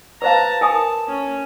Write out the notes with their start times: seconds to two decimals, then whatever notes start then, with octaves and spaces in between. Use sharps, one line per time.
0.22 B4 C5 F5 A5 A#5
0.61 A#4 G#5 A5 D#6
1.08 C#4